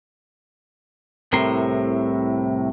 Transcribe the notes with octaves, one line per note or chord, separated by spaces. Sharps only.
C2 A2 C3 A#4 C6